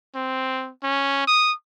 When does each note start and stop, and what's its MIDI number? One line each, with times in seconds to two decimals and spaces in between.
0.15 0.70 60
0.83 1.23 61
1.27 1.53 87